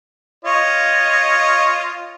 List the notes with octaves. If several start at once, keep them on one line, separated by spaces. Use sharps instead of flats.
F4 C#5 D#5